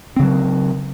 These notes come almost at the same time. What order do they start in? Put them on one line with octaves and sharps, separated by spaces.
C4 C#3 F#3